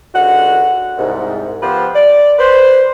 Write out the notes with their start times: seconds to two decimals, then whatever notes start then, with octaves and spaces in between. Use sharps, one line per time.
0.15 C#2 D3 F#4 F#5
0.98 C2 G#2
1.62 F3 B3 G4 B4 C5
1.94 D5
2.39 B4 C5